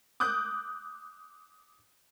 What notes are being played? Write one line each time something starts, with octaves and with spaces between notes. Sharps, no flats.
D6 D#6 F#6 G6